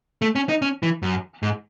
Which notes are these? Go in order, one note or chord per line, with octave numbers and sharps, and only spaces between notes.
A3
C#4
D#4
C#4
E3
F#2
G#2